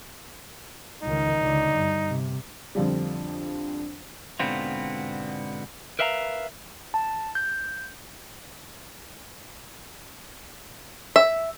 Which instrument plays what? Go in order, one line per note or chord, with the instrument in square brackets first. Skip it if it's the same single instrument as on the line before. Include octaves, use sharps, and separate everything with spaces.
[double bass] C#2 D#3 [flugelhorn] D#4
[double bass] C#2 D3
G2
C3
[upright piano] F2 D3 F3 G3
[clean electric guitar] G#2 B2 D3 B3 C4 F4
A#4 B4 E5 F5 G5 A#5
[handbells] A5
G6
[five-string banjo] E5